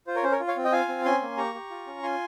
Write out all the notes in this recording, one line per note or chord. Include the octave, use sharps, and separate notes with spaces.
F4 C5
A#4 C#5
C#4 C5
A#4 C#5
F4
C#5 F5
C4
D#5 G5
F4 F5 G#5
C4
C#4 G#5 C6
A#3
G4 A#5 C#6
G4
F4
C#4
F4 G#5 C6